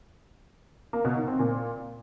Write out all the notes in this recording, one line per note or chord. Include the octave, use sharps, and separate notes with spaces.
A#3
B2
D#3
C4
A#2